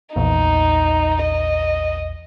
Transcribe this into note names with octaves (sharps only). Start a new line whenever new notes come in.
A#1 E2 A#2 D#4
D#5